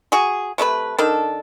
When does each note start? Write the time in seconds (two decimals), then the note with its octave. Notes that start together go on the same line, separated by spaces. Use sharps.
0.12 F#4 G#4
0.58 C3 A3 D#4 B4
0.99 D#3 D4 A4